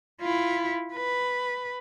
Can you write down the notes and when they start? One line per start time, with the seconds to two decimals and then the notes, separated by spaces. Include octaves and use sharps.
0.21 E4 F4
0.94 B4